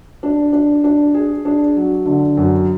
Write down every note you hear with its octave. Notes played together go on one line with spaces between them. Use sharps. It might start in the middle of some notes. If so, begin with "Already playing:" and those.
D4
D4
D4
G#4
D4
F#3
D3
F#2